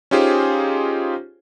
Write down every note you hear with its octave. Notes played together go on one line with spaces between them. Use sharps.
C#4 D#4 F4 G4 G#4 C5